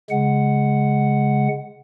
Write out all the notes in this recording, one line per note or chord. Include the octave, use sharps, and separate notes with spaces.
C#3 G#3 F#5